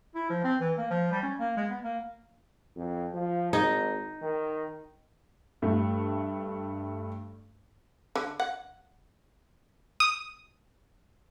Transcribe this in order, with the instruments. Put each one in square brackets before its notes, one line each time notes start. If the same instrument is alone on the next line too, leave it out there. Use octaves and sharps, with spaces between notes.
[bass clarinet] E4
F3
C4
E3
A#3
F3
G3
C#4
A#3
G#3
B3
A#3
[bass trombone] F2
F3
[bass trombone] G#1 [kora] D#4
[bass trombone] D#3
[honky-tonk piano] G2 A3
[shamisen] D3
F#5
[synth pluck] D#6